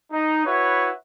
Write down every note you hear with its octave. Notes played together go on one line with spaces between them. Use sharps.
D#4
E4 F#4 B4 C#5